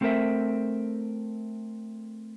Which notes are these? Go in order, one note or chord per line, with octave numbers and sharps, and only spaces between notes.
A3 C4 A4 A#4 C5 E5